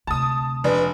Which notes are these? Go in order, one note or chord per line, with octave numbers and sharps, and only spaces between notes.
D2 C3 A5 D#6
F1 D4 B4